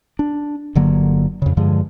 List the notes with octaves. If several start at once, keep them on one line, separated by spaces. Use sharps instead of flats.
D4
G1 D3 F#3 A#3
F2 C#3
G2 D3 F3 G#3